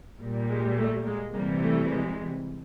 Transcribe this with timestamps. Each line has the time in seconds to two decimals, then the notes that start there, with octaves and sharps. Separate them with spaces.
0.20 A#2 G3
0.49 G#3
0.77 A3
1.06 G#3 A#3
1.34 C3 E3 G3 G#3 A#3
1.62 A3
1.91 G#3